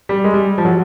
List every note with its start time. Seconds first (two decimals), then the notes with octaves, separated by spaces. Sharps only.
0.09 G3
0.24 G#3
0.34 G3
0.58 F3
0.65 F#3